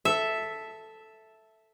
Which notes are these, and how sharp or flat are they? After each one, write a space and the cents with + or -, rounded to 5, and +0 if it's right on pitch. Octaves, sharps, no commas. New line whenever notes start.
A4 +0 E5 +0